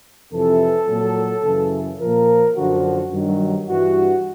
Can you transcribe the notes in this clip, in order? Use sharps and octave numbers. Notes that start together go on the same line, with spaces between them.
F2 C3 E3 A4
A#2 F#3
F#2 C#3 E3
A#2 F3 A#4
F#2 D3 F3 F#4
G2 D#3 F#3
G2 E3 F#4